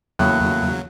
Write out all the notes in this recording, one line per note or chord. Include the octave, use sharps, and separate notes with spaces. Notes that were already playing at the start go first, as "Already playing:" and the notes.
E2 A2 C#3 F#3 A#3 F#6